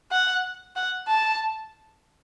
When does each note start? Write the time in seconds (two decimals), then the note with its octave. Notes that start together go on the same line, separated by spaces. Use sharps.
0.11 F#5
0.76 F#5
1.08 A5